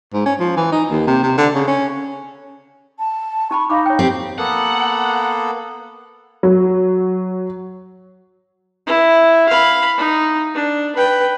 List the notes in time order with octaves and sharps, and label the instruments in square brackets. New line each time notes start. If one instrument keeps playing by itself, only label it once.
[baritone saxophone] G#2
C#4
F3
E3
D#4
D#2
C3
C3
D3
C#3
C#4
[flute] A5
[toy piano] D#4 A5 B5 [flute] C#6
[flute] D#4 [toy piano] F5 B5 D6
[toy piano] C#5 G5
[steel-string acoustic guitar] C4 G4
[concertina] A#3 B3 A4 [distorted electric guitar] F#5
[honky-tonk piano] F#3
[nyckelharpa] E4
F5 B5
D#4
D4
B4 G5